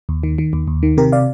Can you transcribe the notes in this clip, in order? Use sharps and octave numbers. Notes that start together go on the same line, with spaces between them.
D#2
D#3
D#3
D#2
D#2
D#3
C3 G4 A#4
D5 F5